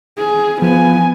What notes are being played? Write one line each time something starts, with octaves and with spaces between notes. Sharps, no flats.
G#4
F3 B3 G#5